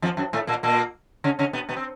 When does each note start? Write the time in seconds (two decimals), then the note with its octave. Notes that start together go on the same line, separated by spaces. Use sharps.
0.02 F2 F3
0.17 F#2 F#3
0.33 A2 A3
0.47 A#2 A#3
0.63 A#2 A#3
1.24 C#3 C#4
1.39 C#3 C#4
1.53 B2 B3
1.69 B2 B3
1.76 C4